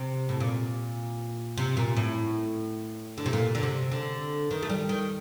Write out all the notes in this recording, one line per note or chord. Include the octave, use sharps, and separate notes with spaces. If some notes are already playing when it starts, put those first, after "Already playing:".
Already playing: C3
A2
A#2
C3
A#2
A2
D3
C3
A#2
D3
C3
D3
D#3
A3
G3
D#3